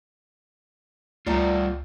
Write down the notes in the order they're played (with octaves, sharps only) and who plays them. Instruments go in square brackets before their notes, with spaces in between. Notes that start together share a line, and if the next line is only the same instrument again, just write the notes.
[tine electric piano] C#2 [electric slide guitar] G3 F4 [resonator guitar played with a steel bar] A3 D5 A#5